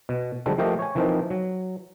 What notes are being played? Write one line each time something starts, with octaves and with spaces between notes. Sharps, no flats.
B2
D3 F3 G3 G#3 A4
F3 A3 A#3 G4 D#5 F5
C#5 G#5
E3 F3 A#3 C4 D#4 F4
F#3